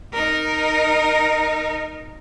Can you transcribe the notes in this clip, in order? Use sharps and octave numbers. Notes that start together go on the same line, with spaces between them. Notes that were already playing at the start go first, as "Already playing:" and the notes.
D#4 A#4